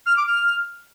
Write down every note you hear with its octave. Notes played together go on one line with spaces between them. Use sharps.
F6
D6
F6